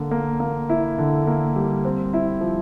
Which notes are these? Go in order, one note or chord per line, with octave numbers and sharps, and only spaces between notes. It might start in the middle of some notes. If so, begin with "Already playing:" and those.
Already playing: D3 A#3
A#3
A#3
E4
D3
A#3
G3
C4
E4
F3